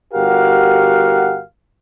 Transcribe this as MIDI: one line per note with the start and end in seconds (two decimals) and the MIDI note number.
0.14 1.42 31
0.14 1.42 66
0.14 1.42 67
0.14 1.42 70
0.14 1.42 77
0.14 1.42 78